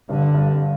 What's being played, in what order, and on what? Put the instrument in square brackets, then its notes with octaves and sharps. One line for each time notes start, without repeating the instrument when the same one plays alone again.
[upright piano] G2 [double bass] D3
[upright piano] G2